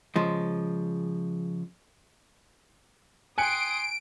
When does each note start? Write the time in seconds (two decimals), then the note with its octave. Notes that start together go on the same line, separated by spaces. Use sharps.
0.16 C#3 F3 G#3
3.38 G5 G#5 C6 D#6 F#6 C#7 D7